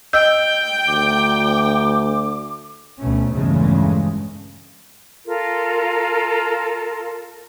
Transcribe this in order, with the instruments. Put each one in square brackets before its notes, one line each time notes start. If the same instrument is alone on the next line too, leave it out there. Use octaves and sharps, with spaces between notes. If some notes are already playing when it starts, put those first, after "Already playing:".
[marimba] D#5 E6 G6 [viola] G5
[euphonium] D2 [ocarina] D6
[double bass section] D2 B2 A3 C#4
A#1 E2 G2 C#3 G#3 A3
[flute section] F4 A4 A#4